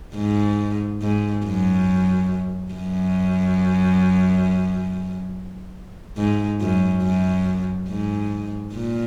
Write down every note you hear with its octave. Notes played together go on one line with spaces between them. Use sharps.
G#2
G#2
F#2
F#2
G#2
F#2
F#2
G#2
A#2